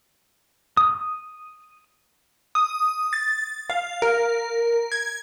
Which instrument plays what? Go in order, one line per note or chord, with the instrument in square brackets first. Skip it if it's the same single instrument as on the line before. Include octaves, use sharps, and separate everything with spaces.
[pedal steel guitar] D#6
[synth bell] D#6
A6
F5
A#4
G#6